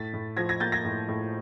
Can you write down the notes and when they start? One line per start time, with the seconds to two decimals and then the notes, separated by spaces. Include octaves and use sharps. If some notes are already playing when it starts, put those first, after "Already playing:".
Already playing: A2 A6 B6
0.13 A2
0.37 F3 G#6 A#6
0.49 G#6 A#6
0.60 A#3 G6 A6
0.72 G#6 A#6
0.85 A2
1.08 A2